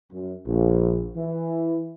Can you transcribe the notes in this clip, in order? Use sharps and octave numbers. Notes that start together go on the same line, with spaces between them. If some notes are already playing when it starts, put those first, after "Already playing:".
F#2
A#1
E3